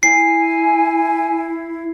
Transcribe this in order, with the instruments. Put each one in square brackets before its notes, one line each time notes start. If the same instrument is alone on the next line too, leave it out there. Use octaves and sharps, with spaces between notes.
[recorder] E4 [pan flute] G#5 [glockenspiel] C7